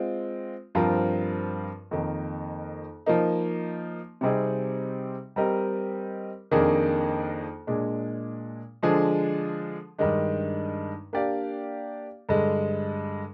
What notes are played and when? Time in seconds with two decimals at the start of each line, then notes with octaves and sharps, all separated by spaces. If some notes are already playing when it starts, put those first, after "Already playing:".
Already playing: G#3 C4 F4
0.75 G2 F3 C4 F4 A#4
1.91 F2 D#3 A#3
3.06 F3 A#3 D#4
4.21 C3 G3 C4 D#4 G#4
5.36 G3 C4 G4 A#4 D#5
6.51 F2 D#3 A#3 D4 G#4
7.67 A#2 G#3 D4 G#4
8.83 D3 F3 G#3 D4 G#4
9.98 G2 D#3 G#3 D4
11.13 A#3 D4 G4 D5 F5
12.29 G2 D3 G#3